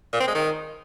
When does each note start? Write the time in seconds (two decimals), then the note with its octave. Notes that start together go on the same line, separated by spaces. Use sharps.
0.13 A#2
0.20 C4
0.28 G#3
0.35 D#3